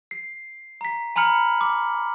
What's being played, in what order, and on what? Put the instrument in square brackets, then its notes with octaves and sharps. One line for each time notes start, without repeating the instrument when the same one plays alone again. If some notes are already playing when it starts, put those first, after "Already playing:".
[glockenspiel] C7
A#5 B6
G#5 A#5 B5 F6 C#7 F#7
D6